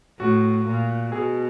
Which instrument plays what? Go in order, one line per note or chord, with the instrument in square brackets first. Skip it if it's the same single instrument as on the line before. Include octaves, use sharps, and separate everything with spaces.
[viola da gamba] A2 [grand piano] F#4
[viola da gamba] A#2
[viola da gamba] B2 [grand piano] G#4